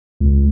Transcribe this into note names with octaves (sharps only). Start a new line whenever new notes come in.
C#2